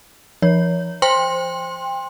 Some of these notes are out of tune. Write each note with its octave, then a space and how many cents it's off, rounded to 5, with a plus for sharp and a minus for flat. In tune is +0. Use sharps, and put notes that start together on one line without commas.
F3 -30 C#5 +20
C5 +0 G5 +30 C6 +15